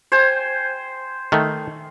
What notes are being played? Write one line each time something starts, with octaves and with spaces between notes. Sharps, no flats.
C5 G5 G#5
D#3 A3